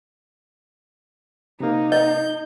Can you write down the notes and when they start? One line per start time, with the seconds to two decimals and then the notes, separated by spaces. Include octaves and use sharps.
1.60 C3 A#3 D#4
1.92 D#5 G6